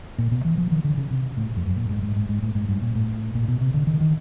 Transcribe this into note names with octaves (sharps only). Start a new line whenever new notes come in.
A#2
B2
E3
F3
D#3
D3
C#3
C3
A2
F2
F#2
A#2
G#2
G#2
G#2
G#2
A2
G#2
G2
A#2
A2
A#2
B2
C3
D3
D#3
D#3